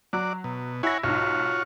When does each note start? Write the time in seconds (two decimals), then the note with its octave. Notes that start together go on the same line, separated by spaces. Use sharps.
0.13 F#3 F#4 D5
0.44 B2
0.83 E4 C#5 F#5 G#5 A#6
1.03 B1 G#2 F4 F#4 C#5